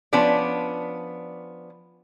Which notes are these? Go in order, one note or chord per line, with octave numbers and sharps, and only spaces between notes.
F3 B3 C#4 D4 D5